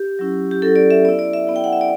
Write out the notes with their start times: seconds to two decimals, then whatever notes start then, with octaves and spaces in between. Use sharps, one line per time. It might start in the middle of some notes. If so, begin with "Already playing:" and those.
Already playing: G4
0.19 F#3 C#4 E4
0.51 G4
0.62 F#3 C#4 E4 A4
0.76 D5
0.91 E5
1.05 B3 E4 D5
1.19 D5
1.33 E5
1.47 B3 E4
1.56 G5
1.64 F#5
1.73 E5
1.81 D5